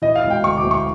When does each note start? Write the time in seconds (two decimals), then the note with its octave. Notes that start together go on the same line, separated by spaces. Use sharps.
0.02 E3 D#5
0.16 F5
0.23 E1
0.30 G5
0.43 D2 C#6
0.57 D6
0.63 D2
0.71 C#6